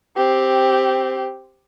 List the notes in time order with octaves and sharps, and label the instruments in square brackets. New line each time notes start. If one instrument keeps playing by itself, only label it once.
[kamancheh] C4 G4